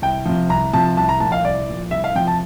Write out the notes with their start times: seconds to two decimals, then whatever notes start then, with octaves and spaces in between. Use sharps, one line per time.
0.02 C2 G5
0.25 C3 F3
0.50 C2 A#5
0.73 C3 F3 A5
0.97 C2 A5
1.09 A#5
1.20 A#2 A5
1.24 F3
1.32 F5
1.44 C2 D5
1.69 A#2 F3
1.91 C2 E5
2.04 F5
2.15 C3 F3 G5
2.27 A5